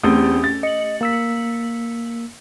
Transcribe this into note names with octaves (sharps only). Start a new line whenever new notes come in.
E2 A3 C4 C#4 G4 D#6
A6
D#5 C#7 F#7
A#3 E6 B6